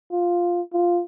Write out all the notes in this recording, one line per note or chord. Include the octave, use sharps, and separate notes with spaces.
F4
F4